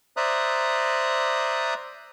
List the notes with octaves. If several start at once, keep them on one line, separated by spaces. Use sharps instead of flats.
C5 D5 E5 A#5 D#6 F#6